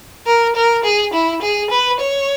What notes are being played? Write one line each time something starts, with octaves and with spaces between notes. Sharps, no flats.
A#4
A#4
G#4
E4
G#4
B4
C#5